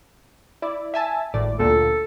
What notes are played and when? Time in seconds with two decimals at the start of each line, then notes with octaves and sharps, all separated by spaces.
0.62 E4 D5
0.94 E5 G#5 A5
1.34 G#1 A2 D5
1.59 D2 A#2 A4